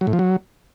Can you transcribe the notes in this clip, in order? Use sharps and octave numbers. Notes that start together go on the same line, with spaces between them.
F#3
A2
F3
F#3